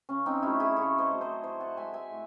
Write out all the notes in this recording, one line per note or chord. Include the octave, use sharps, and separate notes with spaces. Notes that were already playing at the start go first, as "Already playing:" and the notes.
C#3 C#4
C4 D#4
F#3 A3 C#4 E4
E4 G#4
C#3 A4 C#5
C5 D#5
F#3 A3
C5 D#5
A2 C5 D#5
F#5 A5
G#3 E5 G#5
E5 G#5
A2